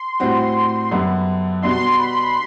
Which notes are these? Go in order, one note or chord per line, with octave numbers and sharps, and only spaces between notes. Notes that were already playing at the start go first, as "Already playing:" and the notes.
Already playing: C6
A2 G3 C4 F#4
F#2 D3 G3 B3
B2 G3 B3 D4 F#4 C6
B5